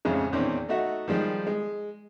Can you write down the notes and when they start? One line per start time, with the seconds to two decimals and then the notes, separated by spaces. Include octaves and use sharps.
0.05 A1 F2 C#3 G#3
0.33 E2 A#2 D#3 C4 C#4
0.69 A3 D#4 F#4 E5
1.08 D#3 F3 G3 G#3
1.47 G#3